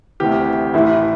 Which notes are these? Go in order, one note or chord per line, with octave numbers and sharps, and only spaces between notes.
D2 C3 E3 G4
A1 A2 E3 E4